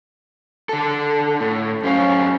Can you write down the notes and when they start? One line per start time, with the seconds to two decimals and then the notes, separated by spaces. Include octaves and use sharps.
0.69 D3 A4
1.40 A2
1.83 F#2 C#4 C5 F5